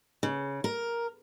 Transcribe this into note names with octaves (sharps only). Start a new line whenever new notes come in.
C#3
A#4